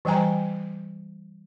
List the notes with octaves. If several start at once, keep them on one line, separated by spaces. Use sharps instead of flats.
E3 G3 G5 G#5 A#5